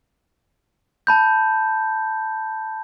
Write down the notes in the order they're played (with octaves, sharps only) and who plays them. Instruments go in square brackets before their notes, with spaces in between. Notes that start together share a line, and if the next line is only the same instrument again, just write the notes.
[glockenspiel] A5 B5 G6